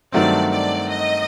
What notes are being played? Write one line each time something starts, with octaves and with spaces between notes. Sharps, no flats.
G2 D#3 F#3 A3 C4 D5
D5
D#5